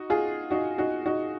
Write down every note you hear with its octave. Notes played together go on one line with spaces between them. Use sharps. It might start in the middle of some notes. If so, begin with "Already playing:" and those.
Already playing: D#4 F#4
F4 G#4
D#4 F#4
D#4 F#4
D#4 F#4